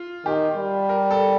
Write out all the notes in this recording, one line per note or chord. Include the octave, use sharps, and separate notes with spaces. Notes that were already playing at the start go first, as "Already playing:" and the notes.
Already playing: F4
D#3 G4
G3
A#4
A4